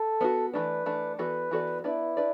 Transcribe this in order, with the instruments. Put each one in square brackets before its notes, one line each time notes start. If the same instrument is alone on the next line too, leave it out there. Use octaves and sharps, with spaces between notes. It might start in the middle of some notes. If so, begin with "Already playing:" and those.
Already playing: [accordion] A4
[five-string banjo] B3 D4 F#4
[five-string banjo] E3 A3 D4 [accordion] B4
[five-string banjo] E3 A3 D4
[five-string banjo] E3 B3 F#4 A4 D5 [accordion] B4
[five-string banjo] E3 B3 F#4 A4 D5
[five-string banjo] B3 D4 B4 D5 [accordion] E4
[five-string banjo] D4 B4 D5